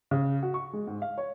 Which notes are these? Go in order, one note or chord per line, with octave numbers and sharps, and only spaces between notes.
C#3
F#4
C#6
G#3
G#2
F5
C#5